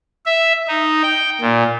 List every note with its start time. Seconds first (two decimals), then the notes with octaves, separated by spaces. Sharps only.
0.26 E5
0.68 D#4
1.03 G5
1.41 A#2